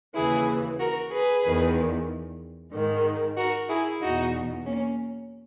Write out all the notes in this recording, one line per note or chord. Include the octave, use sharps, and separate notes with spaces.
D#2 C#3 E3 E4 G#4
F#4 A#4
G#4 B4
E2 D#3
G#2 D#3
F#4 A#4
E4 G#4
E2 B2 D#4 F#4
A#3 C#4